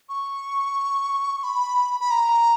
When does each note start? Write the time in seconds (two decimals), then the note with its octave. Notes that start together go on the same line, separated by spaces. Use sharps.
0.09 C#6
1.44 B5
2.00 B5
2.11 A#5